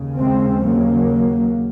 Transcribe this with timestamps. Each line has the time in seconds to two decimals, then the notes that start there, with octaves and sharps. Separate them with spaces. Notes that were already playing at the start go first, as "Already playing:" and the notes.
Already playing: D#2 C#3
0.19 G#3 C4
0.64 F#3 A#3